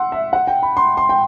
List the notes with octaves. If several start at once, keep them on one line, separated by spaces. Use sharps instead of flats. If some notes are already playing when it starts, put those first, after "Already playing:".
Already playing: F#5 C6 E6
E5
F#5
G5
B5
C6
C6
G5